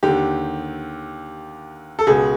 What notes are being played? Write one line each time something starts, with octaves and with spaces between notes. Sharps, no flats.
D#2 D3 G4
A4
C#2 B2 G#4